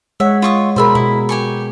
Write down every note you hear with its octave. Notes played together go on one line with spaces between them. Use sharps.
G#3 C#5 E5 F#5
F4 C#6 D#6
B2 G#4 A#4 C5 E5 B5
B2 E4
G4 G#5 C#6